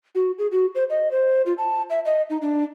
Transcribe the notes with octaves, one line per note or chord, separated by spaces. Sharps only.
F#4
G#4
F#4
C5
D#5
C5
F4
A5
E5
D#5
D#4
D4